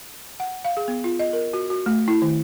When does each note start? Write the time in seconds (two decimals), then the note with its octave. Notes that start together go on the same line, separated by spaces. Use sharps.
0.40 F#5
0.65 F5
0.77 G#4
0.88 B3
1.04 F4
1.19 D#5
1.33 A#4
1.53 F#4
1.70 F#4
1.86 A3
2.08 E4
2.22 D#3